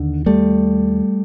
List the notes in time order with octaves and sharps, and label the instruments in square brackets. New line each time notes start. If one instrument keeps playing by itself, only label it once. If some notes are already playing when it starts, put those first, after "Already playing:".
Already playing: [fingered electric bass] D#2 D3
G3 A3